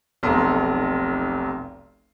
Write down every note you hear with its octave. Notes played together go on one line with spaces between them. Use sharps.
F1 B1 A#5 C6